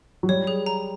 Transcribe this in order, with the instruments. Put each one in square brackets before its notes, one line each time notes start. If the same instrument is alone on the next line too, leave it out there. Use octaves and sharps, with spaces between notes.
[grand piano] F#3
[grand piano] G3 [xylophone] C#5
[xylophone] G#4
A#5